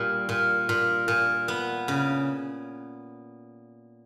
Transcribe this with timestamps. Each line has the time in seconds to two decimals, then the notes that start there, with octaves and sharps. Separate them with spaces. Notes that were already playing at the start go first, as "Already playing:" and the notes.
Already playing: A#2 G3
0.29 A#2
0.69 A#2
1.08 A#2
1.48 B3
1.88 C#3